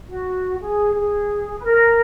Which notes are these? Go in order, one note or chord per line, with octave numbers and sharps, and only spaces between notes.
F#4
G#4
G#4
B4
A#4